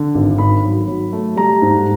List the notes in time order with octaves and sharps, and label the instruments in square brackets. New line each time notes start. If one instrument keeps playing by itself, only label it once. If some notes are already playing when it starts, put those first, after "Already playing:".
Already playing: [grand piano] D3
G#1
D#3 B5
F#3
F#3
A3
G3 A#5
G#2